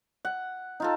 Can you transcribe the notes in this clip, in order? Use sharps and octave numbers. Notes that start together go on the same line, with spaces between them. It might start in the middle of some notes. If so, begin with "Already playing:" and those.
F#5
D#4 F4 A4